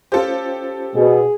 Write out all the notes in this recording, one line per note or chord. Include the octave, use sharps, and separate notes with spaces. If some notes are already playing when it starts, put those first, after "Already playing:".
C#4 F4 G4 A4 C5
B2 G#4